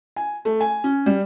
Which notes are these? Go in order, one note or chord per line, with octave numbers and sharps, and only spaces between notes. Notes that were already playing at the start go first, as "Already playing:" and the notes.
G#5
A3
G#5
C#4
G3